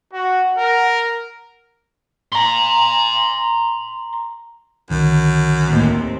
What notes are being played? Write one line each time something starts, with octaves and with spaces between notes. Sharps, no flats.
F#4 F#5
A#4
A#5 C6
C2 F#2 D3 D#3
D#2 A2 C4